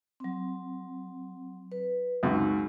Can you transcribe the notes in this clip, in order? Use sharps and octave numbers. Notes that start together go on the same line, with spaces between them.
F#3 C4
B4
C#2 F#2 C#3 C4 D#4